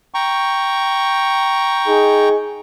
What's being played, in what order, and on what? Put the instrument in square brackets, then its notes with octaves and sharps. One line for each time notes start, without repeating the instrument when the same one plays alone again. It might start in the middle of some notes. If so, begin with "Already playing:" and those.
[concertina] G5 A#5 C#6
[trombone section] D#4 G#4